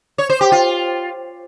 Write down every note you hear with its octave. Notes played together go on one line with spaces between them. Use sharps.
C#5
C5
G4
F4